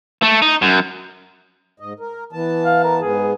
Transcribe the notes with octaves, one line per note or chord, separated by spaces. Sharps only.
A3
D#4
F#2
G#2 D#5
A#4
E3 B3 A5
F5
A#4
G#2 B3 G#4